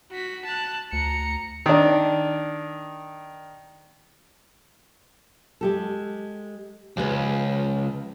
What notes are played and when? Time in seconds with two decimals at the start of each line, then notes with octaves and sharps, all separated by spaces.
0.12 F#4 B6
0.45 A5 F#6
0.93 D2 A#5 C#7
1.66 D#3 D4
5.61 G#3 G4 A4
6.97 C#2 F3 G#4 B4